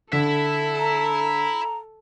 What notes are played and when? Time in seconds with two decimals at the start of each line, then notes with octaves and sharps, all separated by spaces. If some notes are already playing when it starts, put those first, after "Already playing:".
0.13 D3 E4 A4 E5
0.79 A#5